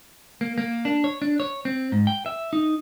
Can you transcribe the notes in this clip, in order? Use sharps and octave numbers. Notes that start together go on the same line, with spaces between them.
A#3
A#3
D4
C#5
D4
C#5
C4
G#2
G5
E5
D#4